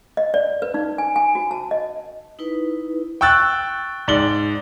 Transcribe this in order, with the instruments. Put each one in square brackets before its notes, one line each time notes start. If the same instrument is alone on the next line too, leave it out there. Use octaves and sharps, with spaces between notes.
[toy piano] D#5
D5
B4
D#4
G#5
G#5
F#4
A5
D#5
[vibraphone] D#4 E4 B4
[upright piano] G5 C#6 E6 F#6 A6
G#2 D5 F#7 G7